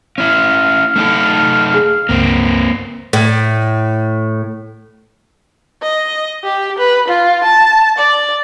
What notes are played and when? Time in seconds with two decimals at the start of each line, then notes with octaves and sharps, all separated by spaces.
0.18 C#4 E4 F5
0.96 A3 D#4 A4
1.74 G#4
2.09 C#2 G2 A#3 C4
3.13 A2
5.82 D#5
6.44 G4
6.78 B4
7.08 F4
7.44 A5
7.98 D5